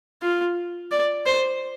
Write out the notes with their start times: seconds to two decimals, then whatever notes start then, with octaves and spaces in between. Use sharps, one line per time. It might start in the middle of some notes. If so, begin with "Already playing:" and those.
0.22 F4
0.91 D5
1.26 C5